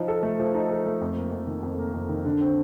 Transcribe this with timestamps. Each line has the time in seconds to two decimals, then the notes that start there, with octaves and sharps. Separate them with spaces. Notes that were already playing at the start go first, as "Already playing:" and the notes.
Already playing: F3 D#4
0.08 A4
0.23 A3
0.40 F3
0.55 D#4
0.71 A4
0.86 A3
1.01 F2
1.17 A#3
1.32 F2
1.47 D#3
1.63 F2
1.79 A#3
1.94 F2
2.09 D#3
2.25 D3
2.41 C4